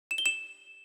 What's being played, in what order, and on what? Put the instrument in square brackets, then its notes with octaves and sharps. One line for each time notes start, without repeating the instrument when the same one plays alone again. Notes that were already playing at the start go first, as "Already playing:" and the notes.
[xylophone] E7
G7
E7